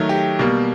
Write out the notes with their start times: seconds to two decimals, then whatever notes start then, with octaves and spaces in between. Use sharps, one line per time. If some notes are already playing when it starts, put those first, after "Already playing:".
Already playing: D#3 F#3 A3
0.09 G4
0.39 B2 G3 A#3